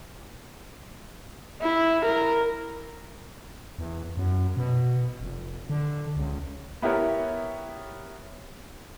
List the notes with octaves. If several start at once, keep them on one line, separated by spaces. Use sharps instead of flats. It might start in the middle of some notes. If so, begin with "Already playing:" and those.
E4
A#4
E2
F#2
B2
F1
D3
C#2
B3 E4 G4 A#4 C#5